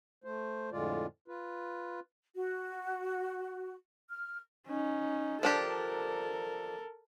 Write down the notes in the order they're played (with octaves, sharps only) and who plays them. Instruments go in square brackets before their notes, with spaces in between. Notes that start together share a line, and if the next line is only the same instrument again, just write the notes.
[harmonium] A3 C5
F2 A2 D3 G#3 F4 D5
F4 B4
[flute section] F#4
F6
[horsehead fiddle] C#4 D#4
[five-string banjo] F3 D4 G4 [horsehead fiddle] A4 A#4